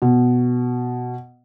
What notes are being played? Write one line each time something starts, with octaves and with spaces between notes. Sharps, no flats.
B2